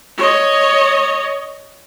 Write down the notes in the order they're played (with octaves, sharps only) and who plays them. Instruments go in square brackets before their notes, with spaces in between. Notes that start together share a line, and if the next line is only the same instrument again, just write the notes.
[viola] C#5 D#5